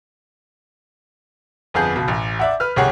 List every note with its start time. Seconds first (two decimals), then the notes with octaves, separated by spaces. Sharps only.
1.74 G1 F2 B3 G#4 G6
1.96 C#2 B2
2.08 A1
2.39 D5 E5 F#5
2.60 B4 F6
2.76 G1 C2 G4 G#4 C#5 F#5